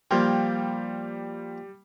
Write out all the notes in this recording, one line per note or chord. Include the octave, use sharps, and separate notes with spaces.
F3 G3 A#3 F4 G5